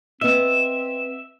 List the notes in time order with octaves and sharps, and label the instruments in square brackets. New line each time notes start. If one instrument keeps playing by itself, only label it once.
[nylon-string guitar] B3 D#5 [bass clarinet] C4 [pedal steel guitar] E5